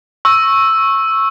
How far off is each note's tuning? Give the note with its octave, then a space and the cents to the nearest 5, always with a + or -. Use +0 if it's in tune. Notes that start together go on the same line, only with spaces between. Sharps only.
C#6 -20 E6 +0